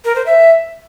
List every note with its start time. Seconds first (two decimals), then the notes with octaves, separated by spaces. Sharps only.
0.05 A#4
0.15 C5
0.26 E5